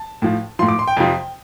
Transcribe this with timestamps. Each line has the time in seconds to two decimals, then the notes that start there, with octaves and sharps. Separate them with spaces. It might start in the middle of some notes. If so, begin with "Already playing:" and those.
Already playing: A5
0.22 A2 F3
0.59 A2 F3 C6
0.68 D6
0.79 C6
0.88 G5
0.97 F2 C3 F3